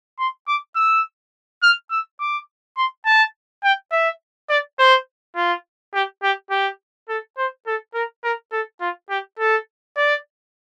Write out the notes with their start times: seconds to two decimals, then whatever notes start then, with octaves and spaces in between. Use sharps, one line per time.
0.19 C6
0.48 D6
0.76 E6
1.63 F6
1.91 E6
2.20 D6
2.77 C6
3.06 A5
3.64 G5
3.92 E5
4.49 D5
4.79 C5
5.36 F4
5.94 G4
6.23 G4
6.51 G4
7.09 A4
7.38 C5
7.66 A4
7.94 A#4
8.24 A#4
8.52 A4
8.80 F4
9.10 G4
9.39 A4
9.97 D5